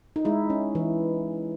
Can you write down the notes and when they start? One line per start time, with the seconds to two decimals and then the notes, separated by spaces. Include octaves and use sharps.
0.16 D#4
0.25 G#3 E4
0.50 C#4
0.75 E3